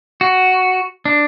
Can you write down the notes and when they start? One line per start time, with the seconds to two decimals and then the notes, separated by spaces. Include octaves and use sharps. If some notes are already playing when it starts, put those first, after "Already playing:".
0.21 F#4
1.05 D4